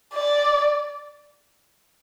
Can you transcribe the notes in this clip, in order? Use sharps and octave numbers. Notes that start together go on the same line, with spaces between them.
D5